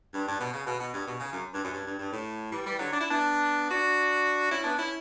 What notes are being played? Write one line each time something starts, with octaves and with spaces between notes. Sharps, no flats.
G2
G2
B2
C#3
B2
B2
G2
B2
C#3
F#2
G2
F#2
G2
G2
G2
A2
E3 G3
E3 G3
D3 F#3
D4
E4
B3 D4
D4 F#4
C#4 E4
B3 D4
C#4 E4